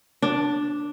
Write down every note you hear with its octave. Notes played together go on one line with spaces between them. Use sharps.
D4